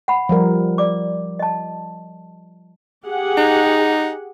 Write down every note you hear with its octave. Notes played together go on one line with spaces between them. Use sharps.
F#5 B5
F3 G3 A#4
D5 D6
D#5 A5
G4 G#4 F#5
D#4